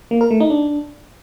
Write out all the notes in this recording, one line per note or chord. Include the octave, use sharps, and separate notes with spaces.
A#3
A#4
A3
D#4
D4